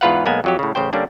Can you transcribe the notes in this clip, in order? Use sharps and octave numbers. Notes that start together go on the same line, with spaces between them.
E2 G#2 F4 B4 F5 F#5
B1 G#3 A#3 B3 G#5
F2 F#3 G4
A2 C#3
A1 C#3 C5 G5
D3 G3 A#3 C#4 D4